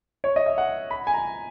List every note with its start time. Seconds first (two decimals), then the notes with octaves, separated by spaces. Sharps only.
0.24 C#5
0.36 D#5
0.46 E5
0.58 F#5
0.91 B5
1.07 G#5
1.14 A#5